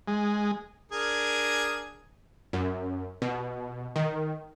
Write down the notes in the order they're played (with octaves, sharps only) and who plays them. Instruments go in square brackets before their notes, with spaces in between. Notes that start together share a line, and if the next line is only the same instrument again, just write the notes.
[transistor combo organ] G#3
[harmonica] D4 G#4 A#4
[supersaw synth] F#2
B2
D#3